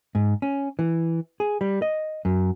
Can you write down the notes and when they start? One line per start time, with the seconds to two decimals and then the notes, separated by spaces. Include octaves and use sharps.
0.15 G#2
0.42 C#4
0.79 E3
1.40 G#4
1.61 G3
1.82 D#5
2.25 F#2